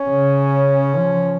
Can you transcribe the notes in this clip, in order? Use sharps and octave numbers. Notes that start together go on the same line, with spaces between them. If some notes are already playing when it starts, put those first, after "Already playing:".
Already playing: C#4
C#3
F3